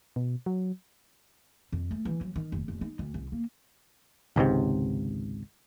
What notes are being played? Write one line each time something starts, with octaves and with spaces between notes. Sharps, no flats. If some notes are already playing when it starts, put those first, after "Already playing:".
B2
F#3
F2
A3
E3
F#3
D#3
F1
F1
D#4
D2
C2
A#3
G#1 C#2 G#2 C3